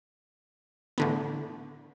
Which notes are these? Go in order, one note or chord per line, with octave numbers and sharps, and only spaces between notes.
A2 D3 B3